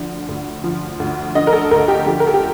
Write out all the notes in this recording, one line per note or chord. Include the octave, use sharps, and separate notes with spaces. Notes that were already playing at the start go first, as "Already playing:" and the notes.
Already playing: D2 D3 F3
D2
F3
D2
D3 D#5
A#4
A4
D2 A#4
G4
F3 G4
A#4
A4
G4